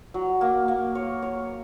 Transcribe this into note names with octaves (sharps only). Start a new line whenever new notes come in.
F#3
A#3
A#3
C#5
C#5